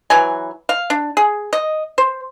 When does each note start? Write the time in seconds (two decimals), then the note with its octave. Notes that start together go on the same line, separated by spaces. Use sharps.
0.10 E3 F#3 G#5
0.69 F5
0.90 D4
1.17 G#4
1.53 D#5
1.98 C5